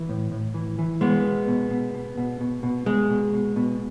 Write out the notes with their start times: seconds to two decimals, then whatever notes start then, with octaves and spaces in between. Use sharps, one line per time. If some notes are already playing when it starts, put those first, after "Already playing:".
Already playing: E3
0.09 A2
0.31 A2
0.54 E3
0.79 E3
1.01 B2 G#3 B3
1.24 B2
1.48 B2
1.70 B2
1.94 B2
2.17 B2
2.41 B2
2.63 B2
2.86 B2 G#3
3.10 B2
3.34 B2
3.56 B2